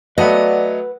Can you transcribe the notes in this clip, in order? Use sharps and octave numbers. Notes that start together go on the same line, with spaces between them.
F#3 A3 B4 D5 D#5 F#5